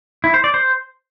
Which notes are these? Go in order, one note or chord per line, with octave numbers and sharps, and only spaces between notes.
E4
C5
D5
C5